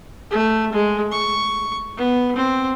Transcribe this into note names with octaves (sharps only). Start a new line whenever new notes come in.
A3
G#3
C#6
B3
C4